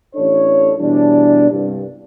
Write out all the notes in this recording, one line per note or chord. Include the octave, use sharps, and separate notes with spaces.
A1 D4 A4 C#5
B2 E3 G3 D4
C2 G2